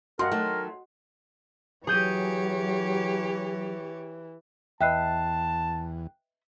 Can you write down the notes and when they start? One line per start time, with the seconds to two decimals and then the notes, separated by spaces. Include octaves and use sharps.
0.19 G2 F#4 A#4 D#5 F#5 C6
0.31 D#3 F#3 A3
1.87 E3 F#3 G4 G#4 C#5 G6 D#7
4.81 E2 B4 D#5 E5 G5 A5 F#6 C7